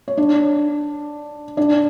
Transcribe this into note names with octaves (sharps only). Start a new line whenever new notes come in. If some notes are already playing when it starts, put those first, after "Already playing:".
C#5
D4 D5
D4 D5